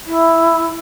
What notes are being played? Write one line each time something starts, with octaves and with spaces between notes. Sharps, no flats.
E4